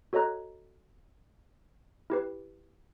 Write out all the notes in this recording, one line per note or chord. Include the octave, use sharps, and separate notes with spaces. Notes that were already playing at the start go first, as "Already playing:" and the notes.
F#4 A4 C#5 D#5 A#5 F#6
E4 G4 B4